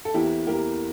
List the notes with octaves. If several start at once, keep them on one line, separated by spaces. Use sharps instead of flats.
A4
E2 E3 A#3 E4 G4
E2 E3 A#3 G4 A#4